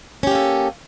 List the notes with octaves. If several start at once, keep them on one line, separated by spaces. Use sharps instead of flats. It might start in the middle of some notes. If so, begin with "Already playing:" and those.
A#3 C#4 G4 A4